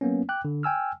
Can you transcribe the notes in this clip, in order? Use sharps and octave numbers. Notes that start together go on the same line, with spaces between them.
F#3 A#3 B3 C#4
G5 D6 F#6
D3
G5 G#5 E6 F6